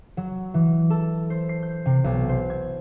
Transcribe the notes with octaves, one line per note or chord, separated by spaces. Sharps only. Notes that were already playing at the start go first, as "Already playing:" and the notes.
F#3
E3
A4
C5
C7
G6
C3
B1
C5
G#6